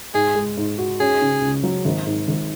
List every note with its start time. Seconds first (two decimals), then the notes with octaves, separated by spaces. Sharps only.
0.14 G#2 G#4
0.35 G#3
0.57 G#2
0.78 F#4
1.00 C#4 G#4
1.21 C#3
1.42 C#2
1.63 F#3
1.85 G#1
2.06 G#2
2.28 G#1